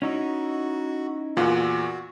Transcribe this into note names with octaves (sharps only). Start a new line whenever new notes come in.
C#4 D#4 E4 F#4
E2 A#2 F4 F#4 F#5 G#5